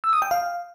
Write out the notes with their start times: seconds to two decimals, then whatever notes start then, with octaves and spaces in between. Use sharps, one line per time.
0.04 E6
0.13 D#6
0.22 G5
0.31 F5